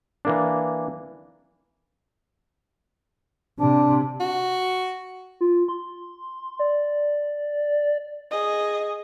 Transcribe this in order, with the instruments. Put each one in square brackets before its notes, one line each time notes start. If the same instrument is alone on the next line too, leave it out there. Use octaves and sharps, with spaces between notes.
[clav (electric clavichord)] E3 A#3 D4
[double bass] C3 [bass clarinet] D4
[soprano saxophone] F#4
[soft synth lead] F4
C6
D5
[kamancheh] G#4 D#5